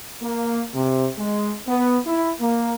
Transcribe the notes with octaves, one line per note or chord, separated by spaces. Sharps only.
A#3
C3
G#3
B3
E4
A#3